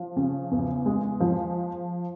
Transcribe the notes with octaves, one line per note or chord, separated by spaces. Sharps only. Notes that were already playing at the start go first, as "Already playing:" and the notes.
Already playing: F3
C#3
E2
G#3
F3